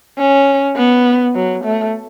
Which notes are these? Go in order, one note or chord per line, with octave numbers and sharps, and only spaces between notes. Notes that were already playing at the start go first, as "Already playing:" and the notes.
C#4
B3
F#3
A3